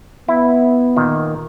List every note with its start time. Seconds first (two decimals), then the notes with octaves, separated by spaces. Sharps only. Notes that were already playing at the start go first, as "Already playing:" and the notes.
0.28 B3 E4
0.96 A#2 D#3